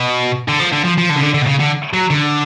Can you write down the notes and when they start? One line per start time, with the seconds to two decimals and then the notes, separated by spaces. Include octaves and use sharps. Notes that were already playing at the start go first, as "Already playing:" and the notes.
Already playing: B2
0.48 D3
0.60 F3
0.73 D3
0.85 F3
0.98 F3
1.10 D3
1.17 C#3
1.23 D3
1.34 D3
1.42 B2
1.47 C#3
1.59 D3
1.93 F#3
2.10 D3